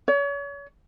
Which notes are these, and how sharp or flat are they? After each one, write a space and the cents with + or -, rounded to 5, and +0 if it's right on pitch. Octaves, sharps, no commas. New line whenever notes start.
C#5 +35